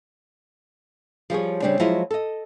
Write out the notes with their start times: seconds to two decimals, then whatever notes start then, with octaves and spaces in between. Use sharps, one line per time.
1.30 F3 G3 G#4 C#5
1.62 C#3 G3 C4 D4
1.80 F3 F#3 G#3 E4 F4 D#5
2.11 A4 D#5